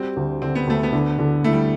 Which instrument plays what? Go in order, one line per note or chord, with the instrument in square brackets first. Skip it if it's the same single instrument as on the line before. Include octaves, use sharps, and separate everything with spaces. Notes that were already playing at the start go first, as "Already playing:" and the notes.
Already playing: [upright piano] G3 F#4 [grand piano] C4
[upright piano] D2
[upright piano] D3 [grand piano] C4
[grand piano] B3
[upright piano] D2 [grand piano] A3
[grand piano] B3
[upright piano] D3
D3
[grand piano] A3 [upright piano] E4
[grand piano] G3